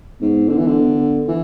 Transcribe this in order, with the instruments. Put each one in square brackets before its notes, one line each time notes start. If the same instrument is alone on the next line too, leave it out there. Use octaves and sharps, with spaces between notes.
[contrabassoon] G#2 [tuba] B3
[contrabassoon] D3
E3
D3
E3